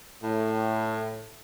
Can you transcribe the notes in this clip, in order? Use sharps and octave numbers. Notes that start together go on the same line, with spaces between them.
A2